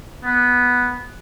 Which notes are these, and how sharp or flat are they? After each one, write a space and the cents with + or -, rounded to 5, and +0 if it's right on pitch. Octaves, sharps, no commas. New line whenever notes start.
B3 -5